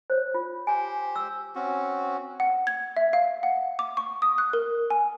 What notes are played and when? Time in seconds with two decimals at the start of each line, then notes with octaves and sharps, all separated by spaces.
0.10 C5 C#5
0.34 F4
0.67 G4 C5 G#5
1.15 E6
1.55 C4 C#4 F#4
2.40 F#5
2.67 G#6
2.97 E5
3.13 F5
3.43 F#5
3.79 D6
3.97 C#6
4.22 D#6
4.38 F#6
4.53 A#4
4.90 G#5